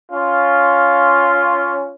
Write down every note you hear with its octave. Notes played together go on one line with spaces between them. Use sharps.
C#4 F4